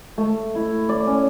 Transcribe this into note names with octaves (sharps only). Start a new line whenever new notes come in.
A3
E4
D5
C#4